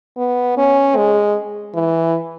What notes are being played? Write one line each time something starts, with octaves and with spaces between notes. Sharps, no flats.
B3
C#4
G#3
E3